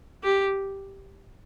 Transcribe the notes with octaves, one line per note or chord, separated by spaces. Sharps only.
G4